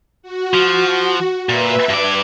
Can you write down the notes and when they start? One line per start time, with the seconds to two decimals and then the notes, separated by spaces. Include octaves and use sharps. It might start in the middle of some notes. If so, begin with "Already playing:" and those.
0.22 F#4
0.54 F3
1.49 A#2 B4 E5
1.89 G2 D5 G#6